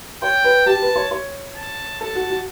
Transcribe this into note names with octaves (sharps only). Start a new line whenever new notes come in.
C#5 G5
B4
G4 A5
B4
C#5
C#5
A5
A4 A5
F#4
F#4